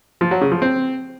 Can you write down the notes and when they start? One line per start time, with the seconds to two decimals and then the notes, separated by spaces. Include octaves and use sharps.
0.21 F3
0.31 F#3
0.41 C#3
0.52 F3
0.62 C4